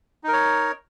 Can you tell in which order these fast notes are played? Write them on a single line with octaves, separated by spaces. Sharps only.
D#4 A#4 C#5